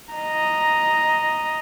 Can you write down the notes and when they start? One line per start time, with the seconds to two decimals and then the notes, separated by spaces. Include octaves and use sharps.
0.13 D#5 A#5